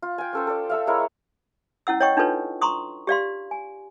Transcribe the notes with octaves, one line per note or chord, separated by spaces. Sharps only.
F4
G5 G#5
C#4 A4 C5
A4 D5
A4 E5 F5
G#3 E4 A#4 C#5
C#4 E4 F#5 E6
C#5 D#5 G5 C#6
D4 D#4 F4 A4 B4 C#5
A#5 C6 C#6 D#6
G4 D5 F5 C6
G#5